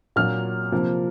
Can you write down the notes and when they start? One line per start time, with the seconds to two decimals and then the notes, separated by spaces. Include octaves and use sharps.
0.16 A#2 F#3 A#3 F6
0.72 C3 F3 A#3